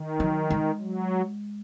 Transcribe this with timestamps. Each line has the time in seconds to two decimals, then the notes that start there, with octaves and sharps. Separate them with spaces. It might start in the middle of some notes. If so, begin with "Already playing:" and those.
Already playing: D#3
0.20 F#3
0.50 G#3
0.81 F#3